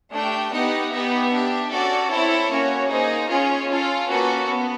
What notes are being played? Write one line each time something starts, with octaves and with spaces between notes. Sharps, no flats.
A3 D4 G4 G5
B3 D#4 G4 F#5
B3 D#4 G4 E5
D4 G4
C#4 F#4 A4 D5
C4 E4 A4 C#5
A#3 C#4 F#4
A#3 D#4 G#4 C5
C#4 F4 G#4 C#5
C#4 F4 A4
A#3 C#4 F#4 A4 B4
B3